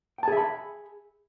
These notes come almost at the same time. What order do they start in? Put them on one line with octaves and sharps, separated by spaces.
G5 A5 G#4 E5 B5